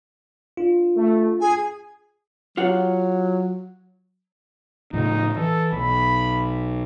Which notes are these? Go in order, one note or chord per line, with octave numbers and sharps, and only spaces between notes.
D4 F4
A3
G#4 G#5
F#3 F4 G4 F#5
A2 C#3 F3 D#4
E3 A4
B1 B5